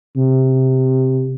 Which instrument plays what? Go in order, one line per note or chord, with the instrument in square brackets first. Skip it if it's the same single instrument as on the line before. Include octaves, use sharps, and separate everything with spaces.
[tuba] C3